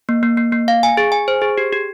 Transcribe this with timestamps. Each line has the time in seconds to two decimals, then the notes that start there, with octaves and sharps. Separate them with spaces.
0.09 A#3
0.23 A#3
0.37 A#3
0.52 A#3
0.68 F5
0.83 G#5
0.97 G#4
1.12 G#5
1.28 C5
1.42 G#4
1.58 G4
1.73 G4